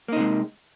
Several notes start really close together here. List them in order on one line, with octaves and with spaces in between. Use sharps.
A#3 D#4 C3 G#3